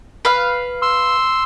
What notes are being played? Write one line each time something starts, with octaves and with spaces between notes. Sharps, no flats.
B4 F5
C6 E6